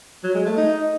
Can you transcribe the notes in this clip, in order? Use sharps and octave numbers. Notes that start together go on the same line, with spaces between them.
F#3
G#3
A3
D#4